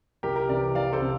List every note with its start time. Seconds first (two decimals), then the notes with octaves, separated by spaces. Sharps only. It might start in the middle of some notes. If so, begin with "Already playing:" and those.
0.23 C2 G4 A#4
0.36 G4 A#4
0.49 C3 E3 A#4 D5
0.75 C2 D5 F5
0.93 A4 C5
1.02 C3